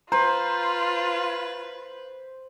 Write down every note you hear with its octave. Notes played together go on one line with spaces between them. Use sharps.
F4 B4 C5 A#5